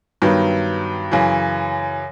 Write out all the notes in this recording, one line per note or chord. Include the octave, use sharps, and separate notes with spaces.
G2 D#3 F#3 B3
F#2 C#3 E3